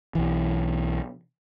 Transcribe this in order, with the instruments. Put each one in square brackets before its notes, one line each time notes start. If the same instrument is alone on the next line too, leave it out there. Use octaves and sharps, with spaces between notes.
[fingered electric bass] B1 E3